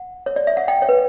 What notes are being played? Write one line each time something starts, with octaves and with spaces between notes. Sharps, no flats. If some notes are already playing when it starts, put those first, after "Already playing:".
Already playing: F#5
C#5
D5
E5
F#5
G5
C#5
B4